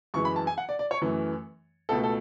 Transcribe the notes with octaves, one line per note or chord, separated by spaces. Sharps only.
F#2 E3 G#3 C#6
B5
A5
G#5
F#5
D5
D5
C#5
F#2 E3 A3
C#2 B2 A3 A4
A4